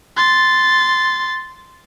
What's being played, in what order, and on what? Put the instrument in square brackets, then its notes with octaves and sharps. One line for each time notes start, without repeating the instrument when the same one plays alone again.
[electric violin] C6 A6